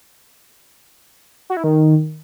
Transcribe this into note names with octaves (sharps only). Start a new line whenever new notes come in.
F#4
E4
D#3